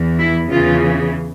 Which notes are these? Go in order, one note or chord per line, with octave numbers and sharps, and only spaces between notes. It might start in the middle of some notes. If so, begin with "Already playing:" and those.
Already playing: E2 E3
E4
E2 C#3 E3 F4